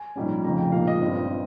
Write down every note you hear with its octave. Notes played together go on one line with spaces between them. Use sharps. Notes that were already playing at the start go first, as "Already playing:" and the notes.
Already playing: G#5
A#1 G#2 G3 C#4
F1 F2 C#3 A#5
G5
A#1 A#2 G#3 D#4 F5
D#5
G1 G2 G3 C4